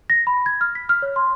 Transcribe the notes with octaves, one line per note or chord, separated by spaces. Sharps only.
A#6
B5
G#6
F6
B6
F6
C#5
C6